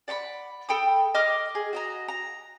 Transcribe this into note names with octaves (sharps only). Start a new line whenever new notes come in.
D5 F#5 A#5 B5
A4 G5 B5 D#6
D#5 D6 F6
G#4
F#4 D#5 A#5
A#5